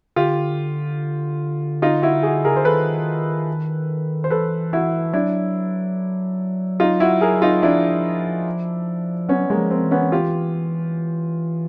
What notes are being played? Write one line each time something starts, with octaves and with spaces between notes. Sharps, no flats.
D3 F4 G4
D#4 F4
E4 F#4
F#4 G#4
C#3 G#4 A#4
D3 C5
D#3 A4 B4
C5
E3 A4 B4
E4 F#4
F#3 D4 E4
D#4 F4
E4 F#4
G#4 A#4
D#4 F4
F3 D4 E4
F#3 B3 C#4
F#3 G#3 A#3
F3
A#3 C4
E3
B3 C#4
F4 G4